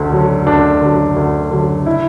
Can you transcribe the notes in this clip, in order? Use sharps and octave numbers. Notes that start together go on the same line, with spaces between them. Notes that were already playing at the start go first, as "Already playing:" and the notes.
Already playing: D2 D3
D3 F#3
D2 D4
D3 F#3
D2
D3 F#3
E4